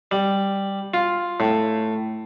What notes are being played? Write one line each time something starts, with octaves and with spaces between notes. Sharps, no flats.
G3
F4
A2